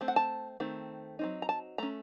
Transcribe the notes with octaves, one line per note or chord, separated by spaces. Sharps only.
A3 C4
F#5
A5
D#3 A3 C4
F#3 C4 D#4
A#5
A5
A3 C#4 A#5